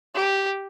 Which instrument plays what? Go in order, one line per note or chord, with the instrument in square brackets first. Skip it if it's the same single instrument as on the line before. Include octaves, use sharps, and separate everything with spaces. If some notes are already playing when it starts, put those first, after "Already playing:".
[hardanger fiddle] G4